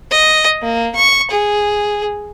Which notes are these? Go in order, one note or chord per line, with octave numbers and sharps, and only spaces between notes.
D#5
A#3
C#6
G#4